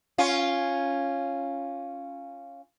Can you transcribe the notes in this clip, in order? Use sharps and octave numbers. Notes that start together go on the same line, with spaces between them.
C#4 F4